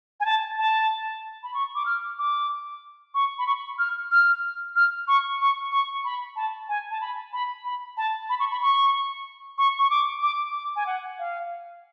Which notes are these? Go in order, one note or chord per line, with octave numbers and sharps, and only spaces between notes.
G#5
A5
A5
B5
C#6
D6
F6
D6
C#6
B5
C#6
F6
F6
F6
C#6
C#6
C#6
B5
A5
G#5
A5
B5
B5
B5
A5
B5
C#6
B5
C#6
C#6
C#6
D6
D6
D6
G#5
F#5
F5